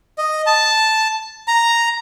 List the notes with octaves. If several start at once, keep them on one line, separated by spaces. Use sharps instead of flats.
D#5
A5
A#5